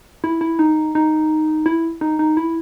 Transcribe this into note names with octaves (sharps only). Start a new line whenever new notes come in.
E4
E4
D#4
D#4
E4
D#4
D#4
E4